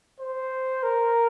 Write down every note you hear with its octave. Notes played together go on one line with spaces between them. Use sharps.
C5
A#4